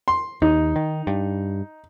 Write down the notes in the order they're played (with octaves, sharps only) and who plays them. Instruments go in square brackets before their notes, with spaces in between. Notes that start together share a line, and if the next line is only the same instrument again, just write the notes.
[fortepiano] C6
[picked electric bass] D#2 [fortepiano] D#4
[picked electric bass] D#3
G2